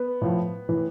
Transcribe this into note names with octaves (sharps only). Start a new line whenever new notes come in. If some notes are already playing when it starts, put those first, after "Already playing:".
Already playing: B3
A2 F3
A2 E3